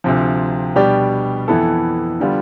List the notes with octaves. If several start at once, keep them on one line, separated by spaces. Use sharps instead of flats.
D2 C3 F3
B2 G3 D4 G4 D5
F2 E3 B3 E4 A4
D3 G3 B3 F4